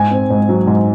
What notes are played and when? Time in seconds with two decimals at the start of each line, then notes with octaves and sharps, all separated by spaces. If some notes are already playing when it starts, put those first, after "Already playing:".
Already playing: G#2 G#5
0.11 C4
0.30 G#2
0.49 F#3
0.67 G#2